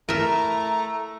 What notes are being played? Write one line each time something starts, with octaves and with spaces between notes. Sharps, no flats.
A3 E4 A#4 E5 A#5